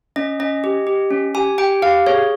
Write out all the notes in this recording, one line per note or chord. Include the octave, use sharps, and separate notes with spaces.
C#4 D#5
C#4 D#5
G4
G4
C#4
G4 G#5
G4 G5
G4 F5
G#4 C#5